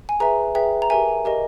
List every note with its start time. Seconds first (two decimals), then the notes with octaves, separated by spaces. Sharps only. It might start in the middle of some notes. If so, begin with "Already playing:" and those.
0.09 G#5
0.20 G#4 B4 E5 A#5
0.55 G#4 B4 E5 G5
0.82 A#5
0.90 G4 A#4 E5 G#5
1.25 G4 A#4 D#5